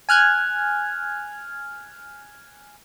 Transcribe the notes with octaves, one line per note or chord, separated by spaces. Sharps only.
G#5 F6 F#6 G#6